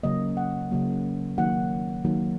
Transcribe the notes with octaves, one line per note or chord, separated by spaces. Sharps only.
C#3 F#3 A#3 D#5
F#5
C#3 F#3 A#3
D#3 F#3 A#3 F#5
D#3 F#3 A#3